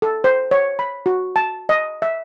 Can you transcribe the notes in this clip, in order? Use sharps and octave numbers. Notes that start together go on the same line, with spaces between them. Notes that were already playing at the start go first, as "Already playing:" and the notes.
A4
C5
C#5
B5
F#4
A5
D#5
E5